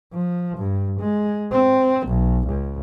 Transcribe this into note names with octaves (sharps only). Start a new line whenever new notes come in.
F3
G2
G#3
C4
B1
C#2